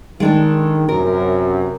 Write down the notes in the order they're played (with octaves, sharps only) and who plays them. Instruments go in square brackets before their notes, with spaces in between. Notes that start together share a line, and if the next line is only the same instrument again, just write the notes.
[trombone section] D#3 [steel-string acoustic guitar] G#3 D4 A4
[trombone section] F#2 C3 [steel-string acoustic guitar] A#4